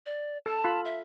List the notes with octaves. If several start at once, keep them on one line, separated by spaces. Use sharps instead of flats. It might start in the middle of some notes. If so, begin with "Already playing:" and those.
D5
A4 A5
F4 A4 B5
E5